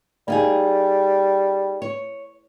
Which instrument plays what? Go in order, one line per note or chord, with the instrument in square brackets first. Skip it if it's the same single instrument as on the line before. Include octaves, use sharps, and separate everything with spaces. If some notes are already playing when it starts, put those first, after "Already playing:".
[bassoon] G3 [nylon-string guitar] A#3 D#4 G#4
[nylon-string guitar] C#5